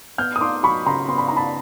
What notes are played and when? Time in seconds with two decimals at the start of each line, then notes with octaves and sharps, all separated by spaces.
0.18 B3 F6 G6
0.36 D#6
0.41 D#4 C6 D6
0.63 F#3 B5 C#6
0.86 C#3 A#5 C6
1.08 B3 C6
1.18 B5
1.28 D#4 A#5
1.37 A5 B5